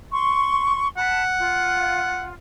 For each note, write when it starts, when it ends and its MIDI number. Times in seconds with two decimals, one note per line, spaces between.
0.12 0.89 84
0.12 0.89 85
0.97 2.28 78
0.97 1.22 81
0.97 1.22 83
1.39 2.34 65